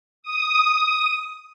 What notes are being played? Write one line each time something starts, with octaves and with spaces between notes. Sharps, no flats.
D#6